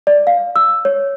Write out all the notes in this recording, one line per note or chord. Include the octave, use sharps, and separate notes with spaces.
D5
F5
E6
C#5